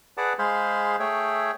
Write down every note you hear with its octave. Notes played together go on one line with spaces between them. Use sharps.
G#4 B4 D5 F#5 A5 D6
G#3 G#4 C5 F5 B5 C6
A3 G#4 C#5 E5 G5